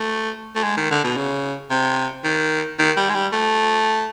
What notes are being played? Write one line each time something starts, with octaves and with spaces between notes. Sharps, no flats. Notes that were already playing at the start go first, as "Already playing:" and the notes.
Already playing: A3
A3
G#3
D#3
D3
B2
C#3
C3
D#3
D#3
G3
G#3
G3
A3